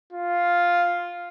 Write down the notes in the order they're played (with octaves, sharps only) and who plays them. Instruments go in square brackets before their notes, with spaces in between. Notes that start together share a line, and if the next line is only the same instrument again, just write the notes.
[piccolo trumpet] F4